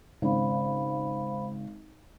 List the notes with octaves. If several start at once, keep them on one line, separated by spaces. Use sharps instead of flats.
G#1 C#3 C5 F5 B5